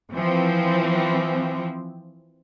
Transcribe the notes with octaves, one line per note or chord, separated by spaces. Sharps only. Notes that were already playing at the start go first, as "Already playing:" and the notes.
E3 F3 C4